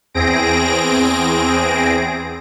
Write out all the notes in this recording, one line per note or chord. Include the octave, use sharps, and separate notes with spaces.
E2 C4 G#4 A#6 D7